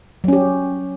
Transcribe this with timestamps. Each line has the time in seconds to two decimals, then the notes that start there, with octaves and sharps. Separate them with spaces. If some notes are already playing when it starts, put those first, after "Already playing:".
0.24 F#3
0.28 C#4
0.33 G4